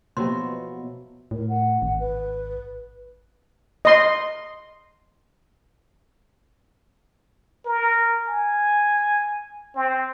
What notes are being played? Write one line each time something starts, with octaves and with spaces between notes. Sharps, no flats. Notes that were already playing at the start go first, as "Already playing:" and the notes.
B2 F3 F#3 A#3 E4 G4 C6
A2 A#4
F#5
G#1
B4
D#5 C6
A#4
G#5
C4